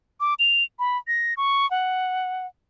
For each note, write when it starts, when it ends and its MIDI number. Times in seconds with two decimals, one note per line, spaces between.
0.20 0.34 86
0.39 0.63 101
0.79 0.97 83
1.08 1.34 94
1.37 1.69 85
1.71 2.46 78